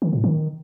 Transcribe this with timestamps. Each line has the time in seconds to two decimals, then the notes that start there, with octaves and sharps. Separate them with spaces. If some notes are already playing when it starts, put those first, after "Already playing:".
0.02 D#3
0.13 A2
0.24 D#3